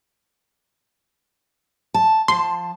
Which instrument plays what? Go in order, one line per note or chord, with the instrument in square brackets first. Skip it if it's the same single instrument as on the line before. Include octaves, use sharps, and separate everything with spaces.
[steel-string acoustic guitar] A5
[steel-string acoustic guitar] F3 A5 [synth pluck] C6